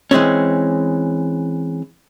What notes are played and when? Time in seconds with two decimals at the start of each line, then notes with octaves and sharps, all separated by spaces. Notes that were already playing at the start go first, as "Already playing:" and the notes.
0.11 E3 G#3 C4 C#4